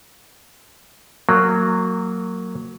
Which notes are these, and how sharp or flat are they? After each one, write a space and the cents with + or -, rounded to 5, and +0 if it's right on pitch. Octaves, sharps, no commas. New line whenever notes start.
F#3 -5 A#3 -25